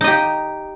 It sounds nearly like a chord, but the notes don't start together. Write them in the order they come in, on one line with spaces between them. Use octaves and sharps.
D#4 D#5 G4